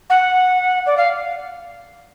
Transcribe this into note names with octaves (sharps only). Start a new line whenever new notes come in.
F#5
D5
F5